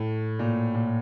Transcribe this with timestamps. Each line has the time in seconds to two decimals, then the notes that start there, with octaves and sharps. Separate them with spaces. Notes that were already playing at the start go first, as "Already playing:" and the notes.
Already playing: A2
0.39 A#2
0.75 A#2